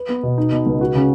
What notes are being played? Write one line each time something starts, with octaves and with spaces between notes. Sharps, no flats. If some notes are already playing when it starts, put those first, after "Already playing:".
Already playing: B4
B3
B2
D#4
B2
C#2
F#4
C#3